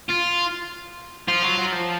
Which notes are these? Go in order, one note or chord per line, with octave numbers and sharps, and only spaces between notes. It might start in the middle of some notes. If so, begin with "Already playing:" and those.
F4
F3 F4
F#3
F#3
F3